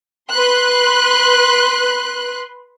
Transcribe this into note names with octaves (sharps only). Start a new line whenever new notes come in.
B4 C6 F#6